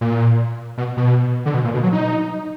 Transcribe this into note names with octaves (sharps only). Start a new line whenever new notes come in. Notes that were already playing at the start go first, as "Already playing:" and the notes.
A#2
B2
B2
D3
B2
A#2
B2
F#3
D#4